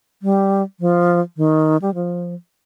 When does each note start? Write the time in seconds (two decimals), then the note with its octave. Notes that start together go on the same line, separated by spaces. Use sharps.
0.22 G3
0.80 F3
1.37 D#3
1.82 G3
1.94 F3